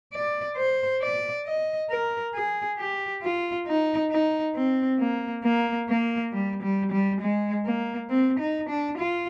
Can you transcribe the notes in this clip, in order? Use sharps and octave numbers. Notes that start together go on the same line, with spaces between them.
D5
C5
D5
D#5
A#4
G#4
G4
F4
D#4
D#4
C4
A#3
A#3
A#3
G3
G3
G3
G#3
A#3
C4
D#4
D4
F4